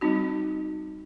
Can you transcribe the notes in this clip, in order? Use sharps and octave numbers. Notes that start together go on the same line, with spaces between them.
G3 C4 D#4 F#4